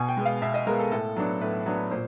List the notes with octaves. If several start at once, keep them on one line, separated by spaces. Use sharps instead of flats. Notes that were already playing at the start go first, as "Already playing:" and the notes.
Already playing: B2 G#5
G5
G#3 B3
F5
B2 E5
D#5
G#3 B3 A#4
A4
A2 A4
F#3 B3 D4
A2 B4
F#3 B3 D4
A#2 C5